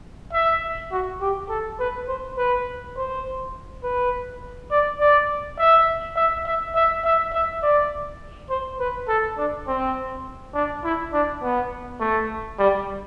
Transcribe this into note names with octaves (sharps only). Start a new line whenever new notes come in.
E5
F#4
G4
A4
B4
C5
B4
C5
B4
D5
D5
E5
E5
E5
E5
E5
E5
D5
C5
B4
A4
D4
C4
D4
E4
D4
B3
A3
G3